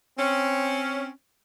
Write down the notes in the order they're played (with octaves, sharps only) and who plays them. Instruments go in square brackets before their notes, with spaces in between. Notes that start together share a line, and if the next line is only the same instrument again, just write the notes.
[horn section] C4 C#4